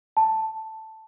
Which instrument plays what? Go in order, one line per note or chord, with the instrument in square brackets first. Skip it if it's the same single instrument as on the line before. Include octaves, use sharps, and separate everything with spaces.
[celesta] A5